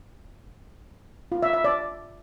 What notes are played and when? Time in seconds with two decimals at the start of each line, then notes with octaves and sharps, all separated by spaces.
1.32 F4
1.43 E5
1.53 E5
1.64 D5